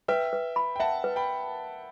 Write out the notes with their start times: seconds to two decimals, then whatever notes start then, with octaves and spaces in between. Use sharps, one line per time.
0.08 B4 E5 G5
0.33 B4
0.56 B5
0.76 G5
0.79 E5 F#5 A5
1.04 B4
1.16 G5 B5